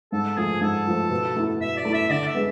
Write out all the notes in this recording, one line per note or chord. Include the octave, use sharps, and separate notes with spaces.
G#2 A4
F3 A3 G#4
G#2 A4
F3 A3
B2
A3 E4
B2 E5
D5
A3 E4
E5
D3 D5
E5
G#3 B3